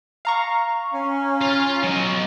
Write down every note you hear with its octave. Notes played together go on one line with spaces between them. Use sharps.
F5 A#5 C#6
C#4
F4
F#3 D#5